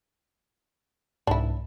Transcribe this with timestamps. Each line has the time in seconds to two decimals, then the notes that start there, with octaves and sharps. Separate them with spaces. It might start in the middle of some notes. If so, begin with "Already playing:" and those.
1.27 C2 G#2 D4 E4